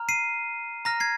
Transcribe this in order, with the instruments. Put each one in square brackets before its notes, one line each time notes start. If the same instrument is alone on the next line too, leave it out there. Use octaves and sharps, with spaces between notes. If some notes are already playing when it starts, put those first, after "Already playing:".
Already playing: [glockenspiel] A#5 F6
C7 D#7
A#5 F6 A#6
G#6 C7